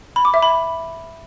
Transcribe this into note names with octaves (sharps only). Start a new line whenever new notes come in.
B5
D6
E5
B5